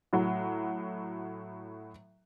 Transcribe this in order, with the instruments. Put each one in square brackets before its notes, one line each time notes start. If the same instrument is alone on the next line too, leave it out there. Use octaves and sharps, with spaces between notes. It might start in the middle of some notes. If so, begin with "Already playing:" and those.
[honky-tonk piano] A2 F#3